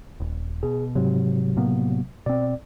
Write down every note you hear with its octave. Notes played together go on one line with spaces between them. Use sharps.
D#1
B2 G#4
G#2 C3 F#3
A2 A#3 B3
B2 C4 D5